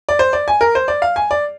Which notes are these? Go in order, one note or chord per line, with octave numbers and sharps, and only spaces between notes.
D5
C5
D5
G#5
A#4
C5
D5
F5
G#5
D5